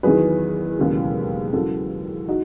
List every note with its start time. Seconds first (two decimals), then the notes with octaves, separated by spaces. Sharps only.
0.03 E2 D#3 F#3 G#4 B4
0.78 E1 D#2 C#3 F#3
1.53 E2 C#3 F#3 F#4 A4
2.28 D#4 F#4